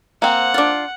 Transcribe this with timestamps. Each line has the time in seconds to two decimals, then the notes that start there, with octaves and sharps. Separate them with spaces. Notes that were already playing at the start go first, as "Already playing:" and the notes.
0.22 A#3 C4 F#5
0.54 D4 F4